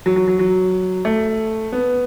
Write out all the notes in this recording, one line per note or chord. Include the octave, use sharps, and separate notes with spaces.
F#3
F#3
F#3
F#3
A3
B3